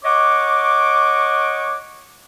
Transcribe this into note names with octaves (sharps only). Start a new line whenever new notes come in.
C#5 D#5 F#5 C#6 D6